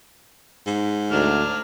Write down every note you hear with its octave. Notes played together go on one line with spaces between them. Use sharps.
G#2
D2 F#3 D4 F6